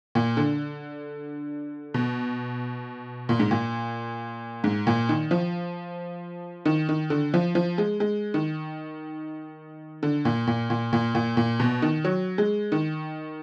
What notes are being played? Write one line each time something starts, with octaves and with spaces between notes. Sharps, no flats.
A#2
D3
B2
A#2
G#2
A#2
G#2
A#2
D#3
F3
D#3
D#3
D3
F3
F3
G#3
G#3
D#3
D3
A#2
A#2
A#2
A#2
A#2
A#2
B2
D#3
F#3
G#3
D#3